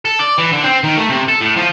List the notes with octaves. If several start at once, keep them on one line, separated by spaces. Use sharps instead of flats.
A4
D5
E3
D3
C4
D#3
A3
C3
A4
A2
F3